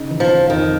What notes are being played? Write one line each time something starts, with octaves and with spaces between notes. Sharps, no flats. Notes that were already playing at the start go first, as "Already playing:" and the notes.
Already playing: C#3 D#4
E3
F3
E3
F2 D#3